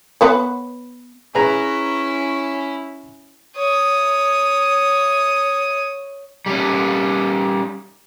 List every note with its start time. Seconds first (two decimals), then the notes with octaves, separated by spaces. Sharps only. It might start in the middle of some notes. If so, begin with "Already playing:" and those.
0.21 B3 B4 C#5
1.35 C#4 E4 G#4 B4 A#5
3.56 C#5 D#6
6.46 G3 C#4